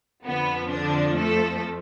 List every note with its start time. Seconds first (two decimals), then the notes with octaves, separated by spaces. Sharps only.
0.25 F2 D3 F3 B3
0.71 D3 D4
1.18 A3 A4